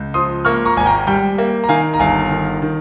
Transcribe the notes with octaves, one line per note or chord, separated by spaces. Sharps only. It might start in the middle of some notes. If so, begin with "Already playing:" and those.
Already playing: C#2
F3 C6 D#6
A#3 C#6 F6
A#5 C#6
G#1 G#5
G5 A#5
G3 G5
A#3
A#5
D#3 F5 G#5
A#5
G1 F5 G#5
D#3
D#3